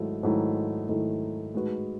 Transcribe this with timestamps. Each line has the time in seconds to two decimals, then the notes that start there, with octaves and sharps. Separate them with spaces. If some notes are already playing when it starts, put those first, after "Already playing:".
Already playing: G#2 D#3 F#3 A3 E4
0.23 G#2 D#3 F#3 A3 E4
0.88 G#2 D#3 F#3 A3 E4
1.54 A2 G#3 D#4 F#4 B4